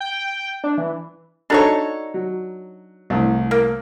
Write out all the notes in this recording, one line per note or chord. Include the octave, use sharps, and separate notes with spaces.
G5
D4
E3
D4 D#4 F#4 A4 C#5 A#5
F#3
C2 A2
A#3